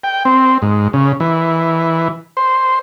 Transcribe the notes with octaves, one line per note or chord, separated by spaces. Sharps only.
G5
C4
G#2
C#3
E3
C5